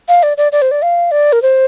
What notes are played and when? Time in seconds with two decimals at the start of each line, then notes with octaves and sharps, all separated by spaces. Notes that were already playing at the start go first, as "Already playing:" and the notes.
0.08 F5
0.23 D5
0.37 D5
0.52 D5
0.62 C5
0.71 D5
0.82 F5
1.11 D5
1.32 A#4
1.42 C5